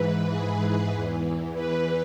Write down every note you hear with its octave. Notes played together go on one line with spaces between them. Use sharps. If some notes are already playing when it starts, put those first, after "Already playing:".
Already playing: G#2 E3 B4
G#4
E2 E3
B4